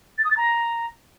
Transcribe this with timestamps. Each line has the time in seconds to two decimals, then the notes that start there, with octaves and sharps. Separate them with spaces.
0.18 A6
0.24 D#6
0.31 A6
0.37 A#5